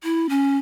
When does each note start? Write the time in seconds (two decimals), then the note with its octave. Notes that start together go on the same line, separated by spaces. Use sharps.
0.03 E4
0.29 C#4